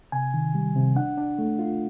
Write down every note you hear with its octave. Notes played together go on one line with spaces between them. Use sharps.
C3 G#5
D#3
G3
C3
D4 F#5
D4
A3
F4